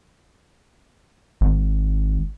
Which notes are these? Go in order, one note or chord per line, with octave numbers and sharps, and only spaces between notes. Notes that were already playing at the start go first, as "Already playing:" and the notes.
G#1